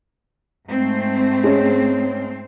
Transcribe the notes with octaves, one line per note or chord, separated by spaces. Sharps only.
G#2 A3 C4
G#3 C#4